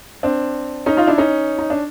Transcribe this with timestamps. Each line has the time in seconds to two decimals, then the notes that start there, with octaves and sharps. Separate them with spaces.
0.23 C4 D4
0.86 C#4 D#4
0.97 D#4 F4
1.07 D4 E4
1.18 C#4 D#4
1.59 D#4
1.70 D4